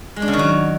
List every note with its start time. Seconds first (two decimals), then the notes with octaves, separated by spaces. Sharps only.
0.16 G#3
0.22 D4
0.28 C#3
0.33 D#3
0.39 F#3